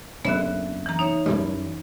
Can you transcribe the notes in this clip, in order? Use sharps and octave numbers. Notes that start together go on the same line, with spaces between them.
F#1 D3 B3 E5 F#6
E3 A#5
D#4 C#5 E5
F#2 E3 G3